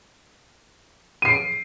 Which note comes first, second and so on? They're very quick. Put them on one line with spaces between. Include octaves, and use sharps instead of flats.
D#7 C7 D7